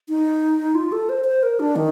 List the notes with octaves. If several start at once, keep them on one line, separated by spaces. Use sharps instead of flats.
D#4
F4
A4
C5
C5
A#4
D4
D#3